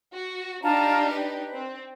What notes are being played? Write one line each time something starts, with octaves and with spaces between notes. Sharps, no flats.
F#4
D4 D#4 F4 G4 A5 A#5
B4
C4